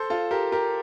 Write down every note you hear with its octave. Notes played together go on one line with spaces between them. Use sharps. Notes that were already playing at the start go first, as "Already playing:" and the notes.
Already playing: A4 C5
F4 A4
G4 A#4
G4 A#4